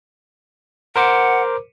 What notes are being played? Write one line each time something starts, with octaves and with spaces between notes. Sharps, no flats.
A#4 C5 F#5 D6